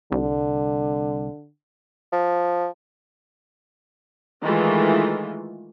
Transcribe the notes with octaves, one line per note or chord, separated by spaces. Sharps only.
C2 D3
F3
D#3 E3 G#3 A3 F4